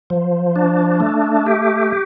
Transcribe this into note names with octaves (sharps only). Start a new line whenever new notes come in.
F3
D4
A3
G4